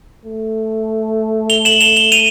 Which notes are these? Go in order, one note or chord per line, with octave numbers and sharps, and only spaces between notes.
A3
F7 G7
E7 F#7
F7 G7
F7 G7
D#7 F7